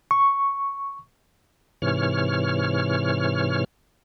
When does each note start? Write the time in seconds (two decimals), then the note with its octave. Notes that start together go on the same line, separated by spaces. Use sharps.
0.11 C#6
1.82 G#2 C3 E3 C#5 F6